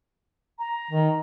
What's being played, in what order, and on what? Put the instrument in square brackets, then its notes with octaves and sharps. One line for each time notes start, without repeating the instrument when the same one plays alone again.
[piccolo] A#5
[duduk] D#3